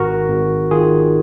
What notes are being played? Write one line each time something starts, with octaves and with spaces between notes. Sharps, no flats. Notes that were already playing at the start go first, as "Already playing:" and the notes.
Already playing: G#1 F#4 A#4
G#1
D#3 F4 G#4